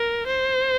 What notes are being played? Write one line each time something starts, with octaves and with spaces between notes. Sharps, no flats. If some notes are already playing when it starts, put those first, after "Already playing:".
Already playing: A#4
C5